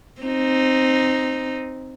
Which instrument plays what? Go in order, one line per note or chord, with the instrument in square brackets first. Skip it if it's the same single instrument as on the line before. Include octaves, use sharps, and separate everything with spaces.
[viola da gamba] C4 D#4